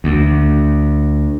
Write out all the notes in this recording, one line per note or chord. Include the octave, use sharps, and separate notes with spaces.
D2